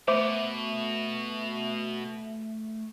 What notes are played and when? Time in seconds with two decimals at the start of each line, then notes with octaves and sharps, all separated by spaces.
0.08 B2 A3 C5 E5 D6